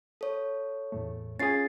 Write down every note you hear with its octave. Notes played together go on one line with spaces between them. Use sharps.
A4 C#5
E2 A2 A3
C#4 F4 G#4 A6 C7